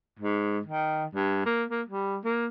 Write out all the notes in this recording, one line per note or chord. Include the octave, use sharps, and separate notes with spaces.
G#2
D#3
G2
A#3
A#3
G3
A#3